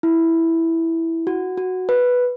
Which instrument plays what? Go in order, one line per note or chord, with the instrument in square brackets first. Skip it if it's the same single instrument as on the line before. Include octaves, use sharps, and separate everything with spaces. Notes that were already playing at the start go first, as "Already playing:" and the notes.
[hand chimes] E4
F#4
F#4
B4